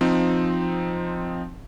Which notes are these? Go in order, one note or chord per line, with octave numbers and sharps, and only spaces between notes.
F3 C4 D#4